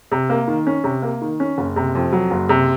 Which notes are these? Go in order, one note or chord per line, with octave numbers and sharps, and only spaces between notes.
C3
A#3
D#3
C#4
C3
A#3
D#3
C#4
F#1
C3
F2
F#3
F#1
C3